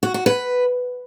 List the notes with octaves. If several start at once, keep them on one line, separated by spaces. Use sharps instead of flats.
F#4
F#4
B4